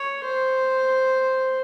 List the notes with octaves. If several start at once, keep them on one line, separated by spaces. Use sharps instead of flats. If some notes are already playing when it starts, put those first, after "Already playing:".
Already playing: C#5
C5